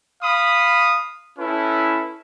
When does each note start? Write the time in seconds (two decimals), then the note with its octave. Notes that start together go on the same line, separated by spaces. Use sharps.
0.22 F5 B5 D#6
1.38 C#4 E4 A4 B4